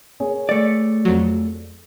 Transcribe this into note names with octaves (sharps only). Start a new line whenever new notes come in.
A#3 G#4 C#5
A3 D5
F2 F#3